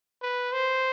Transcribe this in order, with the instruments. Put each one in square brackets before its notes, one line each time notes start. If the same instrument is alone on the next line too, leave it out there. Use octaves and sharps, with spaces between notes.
[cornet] B4
C5